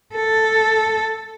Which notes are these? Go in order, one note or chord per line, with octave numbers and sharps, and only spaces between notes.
A4